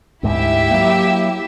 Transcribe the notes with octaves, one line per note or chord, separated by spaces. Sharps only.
D2 G#2 E4 G4 E5
F#3 A#3